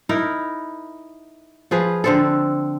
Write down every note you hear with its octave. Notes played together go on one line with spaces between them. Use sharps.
D#4 E4 A#4
F3 G#4 B4
D3 C4 A4